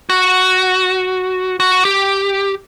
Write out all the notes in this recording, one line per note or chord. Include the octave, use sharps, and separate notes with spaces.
F#4
F#4
G4